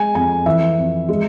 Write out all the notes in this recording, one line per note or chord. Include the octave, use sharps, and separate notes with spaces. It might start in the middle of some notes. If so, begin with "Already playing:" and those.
Already playing: G#3 G#5
F2 G#5
E3 E5
F2
G#3